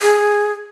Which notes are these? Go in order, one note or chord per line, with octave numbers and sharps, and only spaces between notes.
G#4